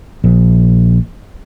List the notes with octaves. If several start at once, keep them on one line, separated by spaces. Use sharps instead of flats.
A#1